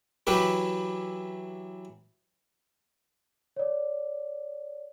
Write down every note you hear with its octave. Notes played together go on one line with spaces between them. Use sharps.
E3 F#3 E4 G4 B4
C#5 D5